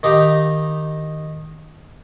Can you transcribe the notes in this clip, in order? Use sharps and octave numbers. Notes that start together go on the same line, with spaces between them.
D#3 D#4 G4 F5 A#5